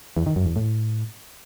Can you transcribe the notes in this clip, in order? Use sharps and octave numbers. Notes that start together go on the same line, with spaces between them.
E2
D#3
F#2
E2
A2